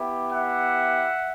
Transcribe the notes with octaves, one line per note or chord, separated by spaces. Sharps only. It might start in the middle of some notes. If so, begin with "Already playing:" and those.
Already playing: B3 E4 G4
E5 F#5